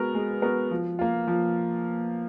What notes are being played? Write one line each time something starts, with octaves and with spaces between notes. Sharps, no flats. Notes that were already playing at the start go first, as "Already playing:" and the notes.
Already playing: G#3 B3 F#4 A#4
G#3
B3 F#4 A#4
F3
A#3 F4
F3